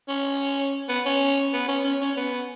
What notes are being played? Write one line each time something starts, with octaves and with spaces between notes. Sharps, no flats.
C#4
B3
C#4
B3
C#4
C#4
C#4
B3